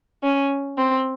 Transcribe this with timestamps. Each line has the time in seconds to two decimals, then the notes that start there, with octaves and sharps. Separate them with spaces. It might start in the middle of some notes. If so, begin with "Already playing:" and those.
0.23 C#4
0.78 C4